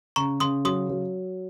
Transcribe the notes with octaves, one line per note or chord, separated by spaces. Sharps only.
C#3 A#5 C#6
C#3 C6 D#6
F#3 C6 D#6
F#3